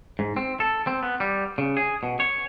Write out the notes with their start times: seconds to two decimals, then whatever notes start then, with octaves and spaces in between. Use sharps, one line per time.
0.19 G#2
0.37 C4
0.60 A4
0.87 C4
1.03 B3
1.20 G3
1.58 C#3
1.77 G#4
2.03 B2
2.20 C#5